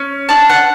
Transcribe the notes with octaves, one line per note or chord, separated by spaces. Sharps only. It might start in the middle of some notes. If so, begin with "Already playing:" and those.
Already playing: C#4
D4 A5
F#5